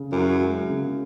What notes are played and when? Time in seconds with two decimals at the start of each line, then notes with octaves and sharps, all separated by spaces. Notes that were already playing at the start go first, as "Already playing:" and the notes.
Already playing: C#3
0.12 F#2 E4
0.41 G#3
0.69 C#3